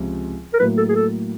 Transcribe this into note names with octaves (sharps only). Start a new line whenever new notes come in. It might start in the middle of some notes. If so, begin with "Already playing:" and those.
Already playing: C#2 C3 F3
A#4
A2 F#3 A#3 B4
A4
G#4
A4